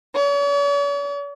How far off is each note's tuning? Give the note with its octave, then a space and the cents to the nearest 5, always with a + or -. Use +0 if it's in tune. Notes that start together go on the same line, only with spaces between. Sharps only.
C#5 +45